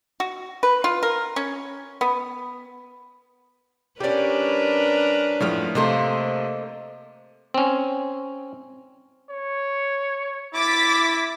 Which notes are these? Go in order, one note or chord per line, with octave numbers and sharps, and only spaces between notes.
F#4
B4
F4
A#4
C#4
B3
G3 C#4 D4 G4 A#4 B4 D5
F#2 A2 F3 A3 F6
C3 A3 A#3 A4 C5 D#5
C4 C#4
C#5
E4 D6 A6 B6